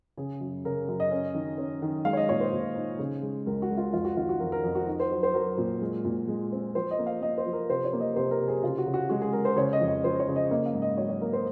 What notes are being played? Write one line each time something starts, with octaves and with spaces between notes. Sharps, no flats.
C#3 G#4
F#2
C#3 A#4
F#2
D#5
C#4
D#3
C#4
D#3
G#3 F5
C#5
D#5
A#2 C#5
C5
A#2
D#4
C#3
G#3
C#2 A#4
F#4
G#3
F4
F2 F4
F#4
D#3 F4
F#4
F2 A#4
A#4
F2
F#4
D#4
C5
F#3
C5
F#3 A#4
A#2
G#3
A#2
G#3
C4
F3 C5
D#5
A#3
F5
A#3 D#5
C5
F3
A#4
C3 C5
C#5
A#3
D#5
C3 C5
A#4
C3
G#4
C#3 F4
F#4
C#3
F#4
G#3 F#4
G#4
G#3 A#4
C5
C#3 C#5
D#5
F2
D#5
F3 C5
C#5
C#3
D#5
A#3 D#5
F5
G#2
D#5
F#3 C#5
C#5
A#3 A#4
C5